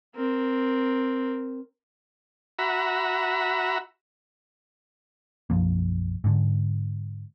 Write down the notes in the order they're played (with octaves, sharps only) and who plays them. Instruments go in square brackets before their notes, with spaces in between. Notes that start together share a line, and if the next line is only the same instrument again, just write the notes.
[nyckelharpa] C4 A#4
[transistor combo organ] F#4 E5 A#5 B5
[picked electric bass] B1 F#2 F3 A#3
G#2 D3